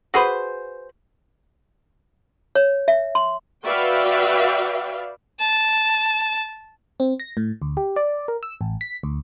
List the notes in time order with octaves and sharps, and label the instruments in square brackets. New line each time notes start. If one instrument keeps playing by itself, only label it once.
[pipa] F#4 G#4 B4 C5
[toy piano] C#5
E5
C6
[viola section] F#4 B4 D5 E5 F5 G5
[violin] A5
[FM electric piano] C4
A#6
A2
D2
G4
D5
A#4
E6
A1
B6
D2